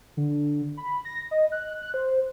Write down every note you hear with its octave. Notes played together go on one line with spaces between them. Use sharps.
D3
B5
A#6
D#5
F#6
F#6
C5